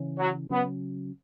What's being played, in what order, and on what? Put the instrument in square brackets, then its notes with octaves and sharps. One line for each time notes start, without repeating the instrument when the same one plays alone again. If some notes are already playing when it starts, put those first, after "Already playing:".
Already playing: [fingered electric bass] C#3 E3 C#4
[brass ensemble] F#3
[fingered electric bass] C#3 F#3 C#4 [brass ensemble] B3